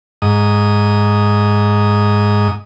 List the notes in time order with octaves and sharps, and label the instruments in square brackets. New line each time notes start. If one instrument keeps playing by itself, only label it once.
[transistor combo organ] G#2 D#6